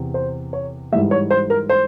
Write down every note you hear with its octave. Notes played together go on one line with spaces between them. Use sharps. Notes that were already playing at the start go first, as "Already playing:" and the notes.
Already playing: E2 C3
C5
C#5
G#2 E3 G3 E5
C#5
C5
A#4
C5